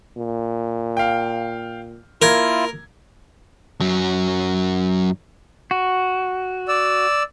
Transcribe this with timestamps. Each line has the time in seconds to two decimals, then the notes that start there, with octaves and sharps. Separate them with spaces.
0.17 A#2
0.97 F5 G5
2.22 A#3 E4 F4 A#4 G#6
3.80 F#2 F#3
5.71 F#4
6.68 D5 E6